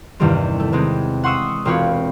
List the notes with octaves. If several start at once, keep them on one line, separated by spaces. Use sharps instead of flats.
E2 G2 C3 D#3 G3 C4
A3
C3 G#3 B3 C4 G#4
F#5 C6 C#6 D#6 E6
E1 C4 F4 B4 C#5 C#6